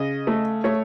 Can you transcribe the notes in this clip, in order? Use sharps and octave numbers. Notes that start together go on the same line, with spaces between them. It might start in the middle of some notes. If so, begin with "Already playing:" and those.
Already playing: C#3 D#5
A3
A3 C#5